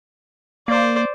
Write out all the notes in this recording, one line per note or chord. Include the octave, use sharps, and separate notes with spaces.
A#3 C5 D5